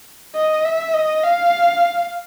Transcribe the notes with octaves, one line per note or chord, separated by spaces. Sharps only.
D#5
E5
D#5
F5